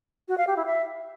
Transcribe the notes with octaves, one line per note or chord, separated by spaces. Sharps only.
F#4
F5
G4
E4
E5